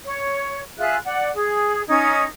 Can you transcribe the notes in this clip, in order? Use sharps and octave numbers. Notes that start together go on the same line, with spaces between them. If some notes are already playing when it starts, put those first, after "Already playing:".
C#5
F4 G#4 E5 F#6
D5 F#5
G#4
C#4 D#4 G#6